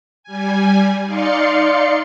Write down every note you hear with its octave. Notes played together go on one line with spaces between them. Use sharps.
G3 G#5
D#4 D5 F5 C6 C#7